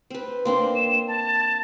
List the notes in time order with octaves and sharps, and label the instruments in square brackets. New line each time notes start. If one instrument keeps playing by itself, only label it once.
[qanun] C4 B4
[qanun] A#3 C4 D4 [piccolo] C6
[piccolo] E7
A5